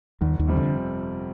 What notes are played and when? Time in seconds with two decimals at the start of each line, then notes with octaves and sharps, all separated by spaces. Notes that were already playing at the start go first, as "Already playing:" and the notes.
0.21 G1 D#2 D#3
0.39 D#2 D#3
0.48 F2 C3 G3 C4
0.57 D3